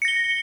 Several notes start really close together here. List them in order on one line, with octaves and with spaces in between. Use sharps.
C#7 A#6 G7